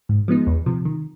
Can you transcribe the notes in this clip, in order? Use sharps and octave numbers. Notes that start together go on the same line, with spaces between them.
G#2
F3 G#3 B3 D#4
E2
C3 F3
D#3